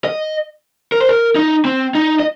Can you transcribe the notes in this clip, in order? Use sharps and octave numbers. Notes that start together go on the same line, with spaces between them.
D#5
A#4
C5
A#4
D#4
C4
D#4
D#5